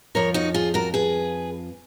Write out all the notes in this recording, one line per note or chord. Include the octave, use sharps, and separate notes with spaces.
F2 F3 A#4 C#5
D#4 F#4
F4 G#4
F#4 A#4
G#4 B4